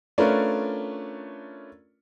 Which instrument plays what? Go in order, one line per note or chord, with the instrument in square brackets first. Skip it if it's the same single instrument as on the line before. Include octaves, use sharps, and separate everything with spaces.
[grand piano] A3 C#4 D4 F4 A#4 B4